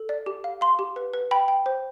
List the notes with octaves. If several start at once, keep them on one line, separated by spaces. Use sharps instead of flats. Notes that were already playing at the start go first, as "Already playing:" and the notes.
Already playing: A4
D5
G4
F5
F5 C6
G4
B4
B4
G5 B5
G5
C5